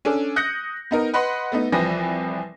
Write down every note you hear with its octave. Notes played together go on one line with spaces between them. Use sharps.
C#4 D4 A4
D#6 F#6 G6 A#6 C#7
B3 D#4 A#4
B4 D#5 F#5 B5 C6
A3 B3 D#4
C2 E3 F3 B4 G5 A#6